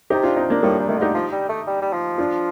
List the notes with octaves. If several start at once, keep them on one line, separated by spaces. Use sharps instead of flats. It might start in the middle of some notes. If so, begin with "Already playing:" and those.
C3 D#4 G4
D4 F4
C4 D#4
A#3 D4
A2 G3 A#3
A#2
D#3 A3
D3 D#4 G4
F3
G3
A3
G3
G3
F3
D4 F4